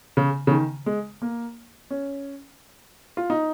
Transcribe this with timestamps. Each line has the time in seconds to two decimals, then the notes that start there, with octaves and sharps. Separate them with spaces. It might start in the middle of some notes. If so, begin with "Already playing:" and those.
0.17 C#3
0.47 C#3
0.51 D#3
0.86 G#3
1.22 A#3
1.90 C#4
3.17 F4
3.30 D#4